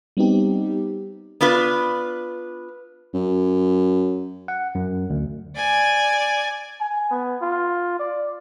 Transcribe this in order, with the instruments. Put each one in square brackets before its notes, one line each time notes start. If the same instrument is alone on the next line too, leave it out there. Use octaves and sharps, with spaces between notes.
[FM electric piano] G3 B3 C4 D#4 G4
[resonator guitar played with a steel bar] B3 D4 F4 B4
[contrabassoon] F#2
[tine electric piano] F#5
F#2
D2
[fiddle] D5 G#5
[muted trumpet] G#5
B3
F4
D5